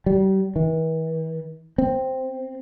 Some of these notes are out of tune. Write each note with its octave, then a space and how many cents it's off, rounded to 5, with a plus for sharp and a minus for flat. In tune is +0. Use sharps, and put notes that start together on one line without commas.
G3 -35
E3 -40
C4 +0